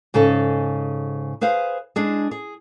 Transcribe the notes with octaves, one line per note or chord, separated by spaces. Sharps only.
G#2 C#3 D#4 A4
G#4 B4 C5 F5
G#3 D4 G#4
G#4